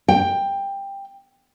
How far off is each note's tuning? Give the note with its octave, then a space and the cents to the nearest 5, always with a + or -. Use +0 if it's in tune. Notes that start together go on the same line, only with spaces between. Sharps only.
G5 +15